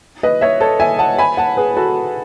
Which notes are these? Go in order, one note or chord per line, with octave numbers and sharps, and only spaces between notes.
B4 D#5
C#5 E5
A4 C#5
E5 G#5
F#5 A5
G#5 B5
F#5 A5
G#4 B4
F#4 A4